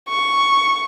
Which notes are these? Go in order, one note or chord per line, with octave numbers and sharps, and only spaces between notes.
C#6